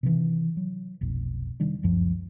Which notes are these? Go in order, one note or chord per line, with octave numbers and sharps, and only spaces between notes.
C3 D#3 E3
F#3
F1 B1
C3 D#3 G3 D4
F1 C#2 F#2 F3